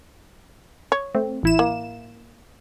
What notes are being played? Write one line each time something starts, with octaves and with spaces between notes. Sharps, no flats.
C#5
A3 C4
A1 E4 E7
A#3